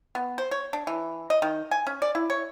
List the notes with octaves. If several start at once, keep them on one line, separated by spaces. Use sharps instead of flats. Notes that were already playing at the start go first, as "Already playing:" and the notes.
B3
C5
C#5
D4
E3
D#5
D#3
G#5
C#4
D5
E4
C#5